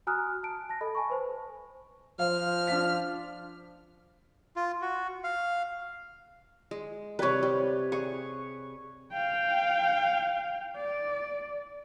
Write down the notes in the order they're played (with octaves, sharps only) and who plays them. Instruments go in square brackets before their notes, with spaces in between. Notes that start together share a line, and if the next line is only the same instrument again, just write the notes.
[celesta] F#4 G#5 A#5 D#6 F6 F#6
A5 D7
A5 A#6
A4 D#5 B5
G#5 A5 B5 C#6
B4 C5
[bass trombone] F3 [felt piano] F5 [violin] F6
[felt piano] D4 F4 B6
[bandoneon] F4
F#4
F5
[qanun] G#3
[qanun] C3 G3 [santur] B4 C#5
[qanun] G3
[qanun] G#4 [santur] C#6
[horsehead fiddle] F5 G5
D5